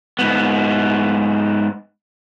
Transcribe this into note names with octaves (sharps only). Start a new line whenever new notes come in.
G#2 B3